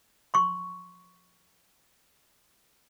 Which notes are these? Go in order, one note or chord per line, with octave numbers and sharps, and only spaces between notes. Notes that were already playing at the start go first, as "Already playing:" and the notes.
C6 C#6